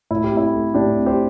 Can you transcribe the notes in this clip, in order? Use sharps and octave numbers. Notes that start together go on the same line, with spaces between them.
A2 E4
G4
C4
E4
A3
A2 D4 G4
C4
G4 C5